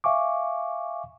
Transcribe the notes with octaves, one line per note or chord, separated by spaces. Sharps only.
E5 F5 G#5 C#6 D6